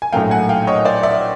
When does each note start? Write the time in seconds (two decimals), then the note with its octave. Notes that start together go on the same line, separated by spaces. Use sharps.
0.02 G#5
0.13 A#1 A2 F#3 A3 F5 G5
0.31 F#5 G#5
0.49 F5 G5
0.67 C#5 D#5
0.85 C5 D5
1.03 D5 E5